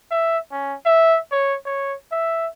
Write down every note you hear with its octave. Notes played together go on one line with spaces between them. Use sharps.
E5
C#4
E5
C#5
C#5
E5